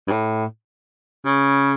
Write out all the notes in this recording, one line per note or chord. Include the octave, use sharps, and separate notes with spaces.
G2
A2
C#3